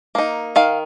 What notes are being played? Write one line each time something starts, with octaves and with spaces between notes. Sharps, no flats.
A#3 D#4
D#3 F5